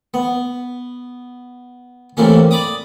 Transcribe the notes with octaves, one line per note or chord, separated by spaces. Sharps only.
B3
A2 C3 E3 A#3 C#4
D5 B5 D6 D#6